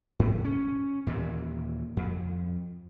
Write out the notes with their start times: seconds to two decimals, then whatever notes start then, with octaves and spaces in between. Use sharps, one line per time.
0.19 G#2
0.45 C#4
1.07 D#2 A#2 E3
1.97 F2